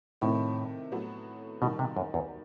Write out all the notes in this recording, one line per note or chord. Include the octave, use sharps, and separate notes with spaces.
A2 C3 D#3 A3 C4 E4
A2 F#3 B3 F#4 A4
B2 D#3 G3 D#4 F#4
C3
F#2
E2